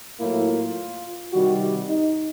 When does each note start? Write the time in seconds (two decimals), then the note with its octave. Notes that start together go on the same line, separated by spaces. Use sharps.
0.20 A2 F#3 A#3 E4
0.48 F4
1.33 C3 D#3 G3 F#4
1.61 G4
1.90 D#4